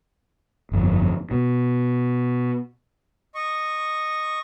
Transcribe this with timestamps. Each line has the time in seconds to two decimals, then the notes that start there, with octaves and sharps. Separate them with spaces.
0.72 G1 F2
1.31 B2
3.35 D#5 C#6